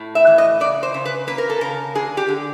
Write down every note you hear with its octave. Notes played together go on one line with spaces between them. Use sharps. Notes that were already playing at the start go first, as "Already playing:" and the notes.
Already playing: A2
E5
E3
D#5
C#3 D5
C5
C#3
B4
A#3 B4
A#4
A4
C#3 A#4
D3 G#4
G4
D3